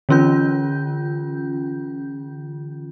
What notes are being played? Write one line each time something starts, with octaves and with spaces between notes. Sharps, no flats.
D3 E3 C#4 F4 G6